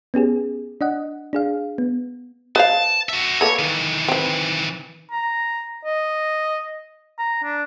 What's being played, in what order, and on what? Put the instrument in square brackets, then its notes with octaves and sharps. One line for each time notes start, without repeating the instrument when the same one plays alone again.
[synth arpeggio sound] B3 C#4 G4 G#4
D4 D#5 F#5
D4 G#4 F5
B3
[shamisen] B4 C5 F5 [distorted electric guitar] A5
[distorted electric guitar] F#4 E5
[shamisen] A#3 A4 B4 [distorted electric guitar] C#5
[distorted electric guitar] D#3 E3
[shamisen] C4 B4
[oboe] A#5
D#5
A#5
D4